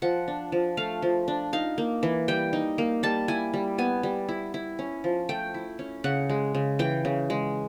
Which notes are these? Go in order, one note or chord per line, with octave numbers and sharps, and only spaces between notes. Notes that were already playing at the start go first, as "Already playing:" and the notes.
F3 F#5
D4
F3
A3 F5
F3
D4
D#4 F5
A#3
E3
G3 G5
D#4
A#3
G3 A5
E4 G#5
G3
B3 G#5
G3
E4
E4
C#4
F3
A3 G5
E4
C#4
C#3 F#5
G#3
C#3
E3 G5
C#3
G#3